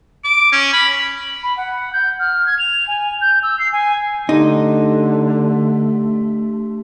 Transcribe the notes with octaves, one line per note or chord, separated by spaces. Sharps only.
D6
C#4
B5
B5
F#5
G6
F6
G#6
F7
G#5
G6
E6
C7
G#5
D3 A3 D4 D#4 G4 C6